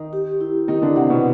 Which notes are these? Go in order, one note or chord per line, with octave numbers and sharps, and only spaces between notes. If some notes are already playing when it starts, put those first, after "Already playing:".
Already playing: D#3 D#4
G4
E4
D#3 D#4 E4
D3 D4
C3 C4 F#5
B2 B3